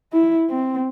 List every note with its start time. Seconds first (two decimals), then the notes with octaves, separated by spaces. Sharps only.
0.12 E4
0.50 C4